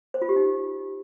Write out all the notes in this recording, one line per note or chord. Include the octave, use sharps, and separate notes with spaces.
C5
F4
G4
D#4